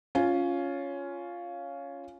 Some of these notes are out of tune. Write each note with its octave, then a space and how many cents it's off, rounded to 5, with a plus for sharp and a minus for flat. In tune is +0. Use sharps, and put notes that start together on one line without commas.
C#4 +10 F4 +0